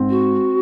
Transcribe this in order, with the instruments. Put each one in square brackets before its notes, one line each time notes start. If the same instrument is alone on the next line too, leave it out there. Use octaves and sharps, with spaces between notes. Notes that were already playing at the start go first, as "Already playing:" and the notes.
Already playing: [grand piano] G#2 C4
[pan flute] F#4